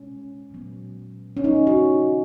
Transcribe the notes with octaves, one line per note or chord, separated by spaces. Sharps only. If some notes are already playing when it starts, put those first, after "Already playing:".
Already playing: B2 G#3 C#4
A#2 F#3 B3
C#4
F3 B3 D#4
F#4